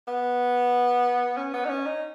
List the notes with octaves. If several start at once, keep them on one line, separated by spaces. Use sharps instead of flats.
B3
C#4
B3
D#4
C#4
D#4